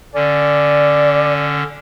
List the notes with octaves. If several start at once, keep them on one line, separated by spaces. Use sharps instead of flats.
D3 C#4 D5